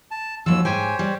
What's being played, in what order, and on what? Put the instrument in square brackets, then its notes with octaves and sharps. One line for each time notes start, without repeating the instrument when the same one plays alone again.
[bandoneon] A5
[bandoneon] D#2 E6 [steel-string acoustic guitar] F3 F#3
[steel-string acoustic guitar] G#2 G5 G#5 [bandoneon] G4 C5 C#5
[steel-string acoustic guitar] G3